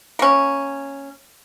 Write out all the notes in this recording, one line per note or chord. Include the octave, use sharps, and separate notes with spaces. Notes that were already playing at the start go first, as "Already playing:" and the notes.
A#3 C#4